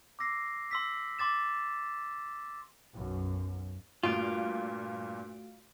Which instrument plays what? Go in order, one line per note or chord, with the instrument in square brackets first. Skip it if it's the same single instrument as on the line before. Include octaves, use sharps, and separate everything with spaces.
[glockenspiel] D6 E6 A#6 C7
C6 E6 B6
C6 D6 A6 E7
[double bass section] B1 F#2
[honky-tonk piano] G2 A#2 [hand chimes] A3 F#4 D7 [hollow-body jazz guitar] F4